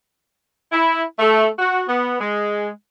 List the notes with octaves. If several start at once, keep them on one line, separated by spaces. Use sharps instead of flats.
E4
A3
F#4
B3
G#3